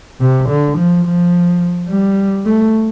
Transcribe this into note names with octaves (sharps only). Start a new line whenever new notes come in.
C3
D3
F3
F3
G3
A3